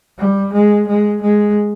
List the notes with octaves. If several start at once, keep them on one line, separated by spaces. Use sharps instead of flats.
G3
G#3
G#3
G#3